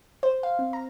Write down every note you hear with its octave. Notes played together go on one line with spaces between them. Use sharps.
C5
F5
C4
A#5